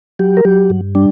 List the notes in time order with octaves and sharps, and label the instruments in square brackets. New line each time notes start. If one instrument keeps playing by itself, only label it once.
[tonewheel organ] F#3 G4
A#4
F#3 G4
G2
G3 D4